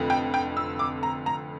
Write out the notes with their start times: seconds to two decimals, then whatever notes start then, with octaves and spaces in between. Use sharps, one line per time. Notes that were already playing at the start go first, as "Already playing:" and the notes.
Already playing: F1 F2 D3
0.10 G5
0.34 G5
0.57 E6
0.79 D6
1.03 A#5
1.26 A#5